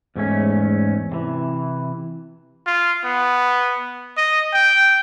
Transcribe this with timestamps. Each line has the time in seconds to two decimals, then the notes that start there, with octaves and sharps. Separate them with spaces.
0.15 E2 G#2 A3 C#4
1.12 C3 E3
2.66 F4
3.05 B3
4.17 D#5
4.54 G5